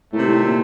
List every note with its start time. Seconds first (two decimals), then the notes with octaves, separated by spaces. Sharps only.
0.13 A2 C3 D#3 A3
0.28 A2
0.42 A#2